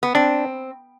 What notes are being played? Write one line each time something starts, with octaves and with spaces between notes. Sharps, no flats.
B3
C4 D4